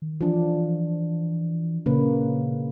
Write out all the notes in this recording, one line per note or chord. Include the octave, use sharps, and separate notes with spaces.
D#3
E3 F3 D4
A#2 C#3 A#3 B4